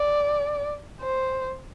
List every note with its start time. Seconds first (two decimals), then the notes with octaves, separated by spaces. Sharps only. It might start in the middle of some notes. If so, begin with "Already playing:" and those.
Already playing: D5
1.01 C5